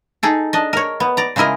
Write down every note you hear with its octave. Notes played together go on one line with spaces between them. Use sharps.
D#4 G#4 A4
D4 D#5
A#4 C#5
B3
D5 A#5
C#3 G#3 E4 A#4 D#5